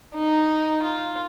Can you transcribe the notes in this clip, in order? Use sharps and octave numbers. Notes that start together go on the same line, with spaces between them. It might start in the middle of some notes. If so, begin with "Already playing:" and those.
D#4
F4